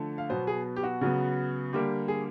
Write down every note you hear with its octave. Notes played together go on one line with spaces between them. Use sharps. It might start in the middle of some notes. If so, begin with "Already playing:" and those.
Already playing: D3 F3 A3
F5
B2 F#3 B3 C5
G#4
G4
F#4
C#3 F#3 B3
D3 G3 A#3 G4
G#4